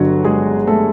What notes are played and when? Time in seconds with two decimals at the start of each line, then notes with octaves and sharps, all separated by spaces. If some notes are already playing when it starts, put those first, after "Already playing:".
Already playing: G1 G2 D3 F#3 F#4
0.25 G#3 G#4
0.67 A3 A4